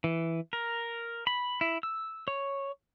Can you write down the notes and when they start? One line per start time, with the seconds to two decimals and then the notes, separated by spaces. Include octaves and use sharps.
0.04 E3
0.53 A#4
1.27 B5
1.61 E4
1.83 E6
2.28 C#5